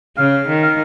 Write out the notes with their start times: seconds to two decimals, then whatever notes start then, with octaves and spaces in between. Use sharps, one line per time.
0.18 C#3 F5
0.48 D#3
0.63 F5